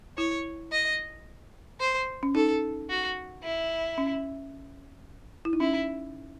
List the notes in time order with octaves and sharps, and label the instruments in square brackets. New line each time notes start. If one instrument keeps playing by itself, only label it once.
[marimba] E4 [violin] C#5
[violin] D#5
C5
[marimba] C#4
[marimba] D#4 [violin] A4
[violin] F#4
E4
[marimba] C#4
E4
D#4
[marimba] C#4 [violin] E4